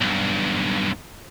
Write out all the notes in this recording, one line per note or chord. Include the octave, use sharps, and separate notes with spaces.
B1 G2